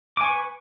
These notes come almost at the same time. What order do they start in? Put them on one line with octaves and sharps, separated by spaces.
D6 G#5 C#6 B4